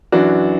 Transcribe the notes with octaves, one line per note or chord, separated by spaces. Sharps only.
F#2 E3 D4 F#4